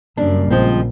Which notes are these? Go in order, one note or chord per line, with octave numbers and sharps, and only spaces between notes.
F#2 C#3 G3 A#3 D4
A#1 F3 G#3 C4